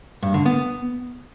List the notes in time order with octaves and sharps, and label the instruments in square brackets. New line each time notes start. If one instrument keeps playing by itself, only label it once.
[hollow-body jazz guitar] G2
D3
B3